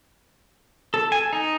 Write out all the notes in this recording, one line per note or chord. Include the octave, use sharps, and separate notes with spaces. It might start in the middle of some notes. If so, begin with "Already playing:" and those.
A4
G#5
D#4